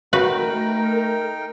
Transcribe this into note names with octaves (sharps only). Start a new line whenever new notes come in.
A3 D#4 F#4 A#4 B4 G5